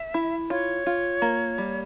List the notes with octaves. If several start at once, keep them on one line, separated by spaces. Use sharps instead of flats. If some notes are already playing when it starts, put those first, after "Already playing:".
Already playing: E5
E4
F4 C#5
F4
A#3
G3